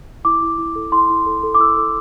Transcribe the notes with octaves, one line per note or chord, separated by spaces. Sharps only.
E4 D6
E4
E4
A4
E4 C6
E4
A4
A4
D6
E4 E6
A4